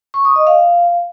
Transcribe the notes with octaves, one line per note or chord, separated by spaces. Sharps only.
C#6
D#6
D#5
F5